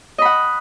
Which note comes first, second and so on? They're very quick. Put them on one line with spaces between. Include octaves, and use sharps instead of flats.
D#5 B5 F#5